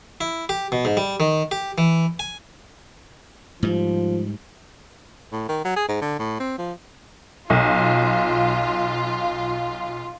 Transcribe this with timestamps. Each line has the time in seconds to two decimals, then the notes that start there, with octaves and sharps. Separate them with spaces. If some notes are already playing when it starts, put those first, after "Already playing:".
0.21 E4
0.49 G4
0.72 B2
0.85 G#2
0.97 G3
1.20 D#3
1.51 G4
1.78 E3
2.19 G#5
3.63 G#2 F3 G3
5.32 A2
5.49 D#3
5.64 F#3
5.76 G#4
5.88 G#2
6.01 D3
6.19 A2
6.40 C4
6.58 F3
7.50 B1 F4